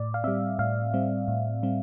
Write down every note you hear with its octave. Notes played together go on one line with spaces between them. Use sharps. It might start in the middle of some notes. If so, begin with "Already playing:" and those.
Already playing: A2 D5
F5
G3 C4 E5
A2 F5
G3 C4
A2
G3 C4